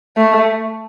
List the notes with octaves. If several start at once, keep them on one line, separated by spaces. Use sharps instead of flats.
A3